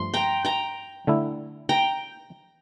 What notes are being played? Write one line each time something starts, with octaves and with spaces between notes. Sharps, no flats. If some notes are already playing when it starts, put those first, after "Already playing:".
Already playing: G2 F3 A3 C6
G5 A#5
G5 A#5
D3 A3 E4
G5 A#5